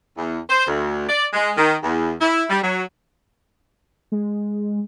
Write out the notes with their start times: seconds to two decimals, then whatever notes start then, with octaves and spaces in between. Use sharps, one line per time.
0.17 E2
0.49 C5
0.67 D2
1.09 D5
1.34 G#3
1.57 D#3
1.84 E2
2.21 E4
2.50 G3
2.62 F#3
4.12 G#3